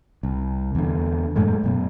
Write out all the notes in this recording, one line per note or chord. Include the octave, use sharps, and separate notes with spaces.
C2
E2 D3
F#2 A2 G#3 A3
F#2 B2